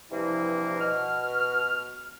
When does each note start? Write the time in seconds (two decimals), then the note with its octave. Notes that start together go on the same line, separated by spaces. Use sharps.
0.11 G2 C3 E3 F3 A#3 E4
0.80 B2 F6